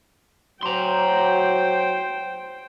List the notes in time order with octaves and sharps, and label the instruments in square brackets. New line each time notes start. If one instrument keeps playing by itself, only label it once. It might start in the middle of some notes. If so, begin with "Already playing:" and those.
[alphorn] F#3 [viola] C5 G5 [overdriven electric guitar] A#5 C6